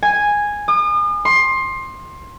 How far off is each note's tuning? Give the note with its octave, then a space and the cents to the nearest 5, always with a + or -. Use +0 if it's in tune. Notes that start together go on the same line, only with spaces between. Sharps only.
G#5 -5
D#6 -40
C6 +20